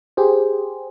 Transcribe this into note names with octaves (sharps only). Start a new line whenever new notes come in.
G4 G#4 C5